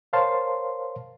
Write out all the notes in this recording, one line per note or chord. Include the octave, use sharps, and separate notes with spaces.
A#4 C5 C#5 F5 A5 C6